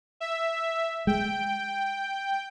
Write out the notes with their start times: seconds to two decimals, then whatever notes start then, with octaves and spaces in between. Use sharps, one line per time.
0.20 E5
1.07 G#3 G5